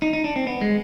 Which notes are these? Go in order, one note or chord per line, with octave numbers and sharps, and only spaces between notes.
D#4
D#4
D4
C4
B3
G#3